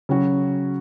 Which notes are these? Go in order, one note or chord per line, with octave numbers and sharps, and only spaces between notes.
C#3 F#3 C#4 F#4